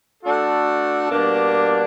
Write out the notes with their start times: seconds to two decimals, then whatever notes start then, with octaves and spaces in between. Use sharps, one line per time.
0.24 A3 D4 F#4 A4
1.10 B2 G3 A#3 D4